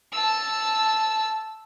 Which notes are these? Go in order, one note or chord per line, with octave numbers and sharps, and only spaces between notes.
A5 E6